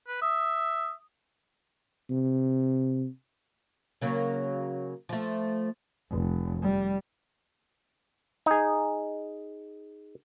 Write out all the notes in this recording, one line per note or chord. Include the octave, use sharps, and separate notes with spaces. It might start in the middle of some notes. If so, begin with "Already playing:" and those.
B4
E5 D#6
C3
C#3 F#3 A#3
F3 A3
F1
G3
D#4 G#4